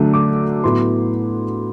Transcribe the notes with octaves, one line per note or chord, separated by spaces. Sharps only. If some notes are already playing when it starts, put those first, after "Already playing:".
Already playing: D3 F#3 A3 D4
D6
A2 F#3 B3 E4 C6